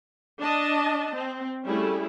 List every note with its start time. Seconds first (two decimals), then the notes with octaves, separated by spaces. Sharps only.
0.41 D4 D#5 A5
1.14 C4
1.65 G3 A3 C#4 E4 G#4